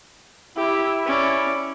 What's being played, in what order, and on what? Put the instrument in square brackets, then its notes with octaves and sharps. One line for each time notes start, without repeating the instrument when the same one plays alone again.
[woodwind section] E4 [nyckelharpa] G4
[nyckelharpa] C#4 D5